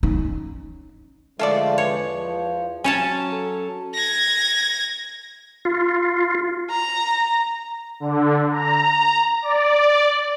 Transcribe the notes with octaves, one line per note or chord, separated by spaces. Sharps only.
C#4 D#4
D3 F3 G#3 A3 F4 A4 D5
E2 C#5
F3
F#3 C#4 C#5 G#5 A5
A4
G#6 A#6
F4
A#5
D3
A#5
D5